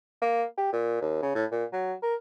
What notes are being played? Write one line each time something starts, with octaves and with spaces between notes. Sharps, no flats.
A#3
G4
A#2
D#2
C#3
A2
A#2
F#3
A#4